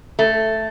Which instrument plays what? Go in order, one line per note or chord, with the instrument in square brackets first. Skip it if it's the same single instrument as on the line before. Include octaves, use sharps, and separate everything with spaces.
[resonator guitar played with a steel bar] A3